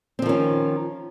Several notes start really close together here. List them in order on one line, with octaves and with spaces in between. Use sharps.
C4 F3 D#3 C#4